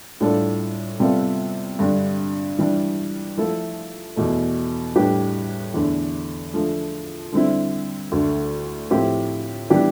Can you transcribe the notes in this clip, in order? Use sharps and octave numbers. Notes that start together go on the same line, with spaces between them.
A2 G3 D4 F4 A4
C3 G3 B3 F4 A4
G2 D3 G3
E3 G3 D4
F3 A3 E4 A4
E2 B2 A3
A2 G3 D4 G4 B4
E2 D3 A3
D3 F3 A3
D3 G3 C4 E4
D2 D3 A3
A2 F3 C4 E4 G4
E3 G3 B3 D4 G4